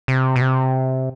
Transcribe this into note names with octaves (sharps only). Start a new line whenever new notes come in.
C3
B2
C3